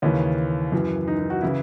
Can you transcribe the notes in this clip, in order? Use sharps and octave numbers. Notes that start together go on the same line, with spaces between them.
D#2 C#3 E3 C#4
F#2 E3
D#4
D#4
F#4
C#3 E3 E4